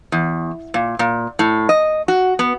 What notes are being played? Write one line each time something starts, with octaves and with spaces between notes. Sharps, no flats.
E2
A#2
A#2
A2
D#5
F#4
B3